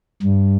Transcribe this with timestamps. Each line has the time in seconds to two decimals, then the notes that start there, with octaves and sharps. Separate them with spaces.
0.23 G2